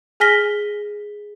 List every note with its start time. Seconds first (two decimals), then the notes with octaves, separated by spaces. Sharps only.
0.20 G#4 G#5 F6 A#6 B6 G7